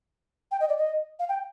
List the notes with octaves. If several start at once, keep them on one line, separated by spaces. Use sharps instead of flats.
G5
D#5
D5
D#5
F5
G5